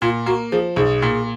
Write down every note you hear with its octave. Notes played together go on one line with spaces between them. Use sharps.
A#2 F4
A#3 F#4
F3 G#4
B1 G#4
A#2